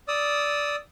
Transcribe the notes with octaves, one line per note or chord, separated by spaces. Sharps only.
D5 D#6 E6